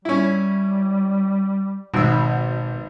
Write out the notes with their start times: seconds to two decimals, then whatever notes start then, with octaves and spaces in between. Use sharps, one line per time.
0.05 G3 C#4 E4
1.94 G#1 B2 E6